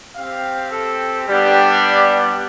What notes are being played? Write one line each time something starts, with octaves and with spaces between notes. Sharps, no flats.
C4 G4 F5
A4
G3 B3 D4 G4